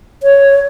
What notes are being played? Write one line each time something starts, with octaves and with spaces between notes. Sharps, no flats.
C#5